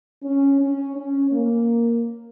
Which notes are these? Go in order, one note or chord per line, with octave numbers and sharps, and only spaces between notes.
C#4
C#4
C#4
A#3